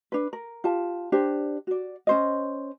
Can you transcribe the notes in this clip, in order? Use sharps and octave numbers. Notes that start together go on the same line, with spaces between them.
D4 B4
A#4
F4 G4 A5
D4 G4 C5
F#4 D5
C#4 C5 D#5